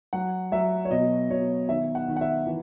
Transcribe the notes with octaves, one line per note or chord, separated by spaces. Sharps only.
F#3 F#5
F#3 E5
C#5
B2 D#5
B2 C#5
D#3 E5
F#5
D#3
F#5
E5
E3